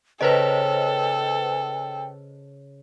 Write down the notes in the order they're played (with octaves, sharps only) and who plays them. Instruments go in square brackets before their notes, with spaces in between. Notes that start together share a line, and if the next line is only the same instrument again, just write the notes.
[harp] C#3 [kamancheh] A4 [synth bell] B4 C5 D#5 [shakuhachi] G5